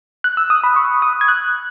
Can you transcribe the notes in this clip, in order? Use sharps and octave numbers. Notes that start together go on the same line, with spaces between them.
F#6
E6
D#6
B5
C#6
D#6
G#6
F#6